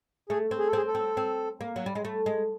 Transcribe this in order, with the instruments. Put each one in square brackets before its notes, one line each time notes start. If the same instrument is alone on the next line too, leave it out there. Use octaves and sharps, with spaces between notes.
[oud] A3 [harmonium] G#4
[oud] C4
[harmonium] G#4
A4
[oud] C4 [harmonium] G#4
[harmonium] A4
[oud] C4
C4
A#3
F#3
G3
G#3
A3
G#3